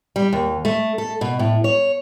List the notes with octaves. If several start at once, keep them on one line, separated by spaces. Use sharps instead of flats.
G3
D#2
A3
A4
B2
A2
C#5